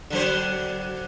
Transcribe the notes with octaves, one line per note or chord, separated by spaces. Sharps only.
D3 F#3 C5